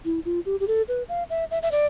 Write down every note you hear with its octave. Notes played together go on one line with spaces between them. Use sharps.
E4
F4
G4
G4
A4
B4
F5
E5
E5
E5
D5